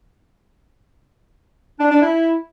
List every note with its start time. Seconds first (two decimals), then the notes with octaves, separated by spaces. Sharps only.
1.79 D4
1.90 D4
2.01 E4